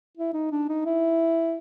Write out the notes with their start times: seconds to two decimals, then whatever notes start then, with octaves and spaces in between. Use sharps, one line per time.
0.17 E4
0.33 D#4
0.52 D4
0.69 D#4
0.85 E4